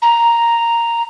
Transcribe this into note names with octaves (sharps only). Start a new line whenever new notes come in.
A#5